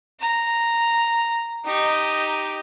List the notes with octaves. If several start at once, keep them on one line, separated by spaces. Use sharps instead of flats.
A#5
D#4 G4